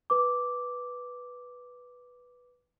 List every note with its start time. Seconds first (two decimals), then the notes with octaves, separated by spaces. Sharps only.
0.10 B4 D6